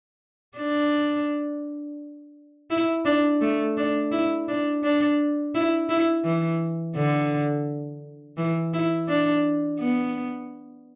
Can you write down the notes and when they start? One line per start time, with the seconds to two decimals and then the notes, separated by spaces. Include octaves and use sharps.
0.57 D4
2.71 E4
3.05 D4
3.41 A3
3.77 D4
4.12 E4
4.48 D4
4.84 D4
5.55 E4
5.89 E4
6.25 E3
6.96 D3
8.38 E3
8.74 E4
9.09 D4
9.80 B3